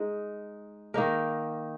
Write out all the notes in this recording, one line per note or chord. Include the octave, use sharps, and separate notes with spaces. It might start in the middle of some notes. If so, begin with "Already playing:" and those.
Already playing: G#3 D#4
D#3 A#3 D#4 A#4